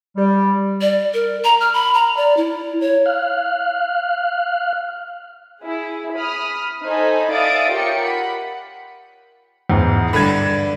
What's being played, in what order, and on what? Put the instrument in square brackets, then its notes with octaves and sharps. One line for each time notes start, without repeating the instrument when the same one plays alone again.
[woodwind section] G3
[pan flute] D5
A#4
A#5
F6
B5
A#5
D5
E4
C#5
[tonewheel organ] F5 F6 F#6
[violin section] E4 G#4
B5 D#6 F6
D#4 A4 C5 D#5 G#5 B5
D5 E5 F5 D#6 A6 D7
F4 G4 A#4 C#5 G5 C#7
F#5 B5
[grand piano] E2 G#2
[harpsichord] G2 D3 [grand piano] B5 G#6